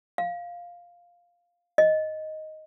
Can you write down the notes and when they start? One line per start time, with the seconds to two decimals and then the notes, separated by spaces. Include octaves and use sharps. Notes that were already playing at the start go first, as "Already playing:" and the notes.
0.18 F5
1.78 D#5